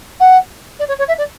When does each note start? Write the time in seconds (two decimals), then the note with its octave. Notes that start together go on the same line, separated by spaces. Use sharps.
0.20 F#5
0.79 D5
0.88 C#5
0.99 C#5
1.08 E5
1.18 D5